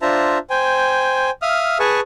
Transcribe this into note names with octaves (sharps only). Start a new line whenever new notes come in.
D4 F4 C5 E5 A5 A#5
C5 G5 G#5
E5 F5 D#6 F6
G#4 B4 G#5 A5 C#6